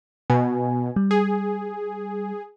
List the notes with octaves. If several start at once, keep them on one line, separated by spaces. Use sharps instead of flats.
B2 G#5
G3
G#4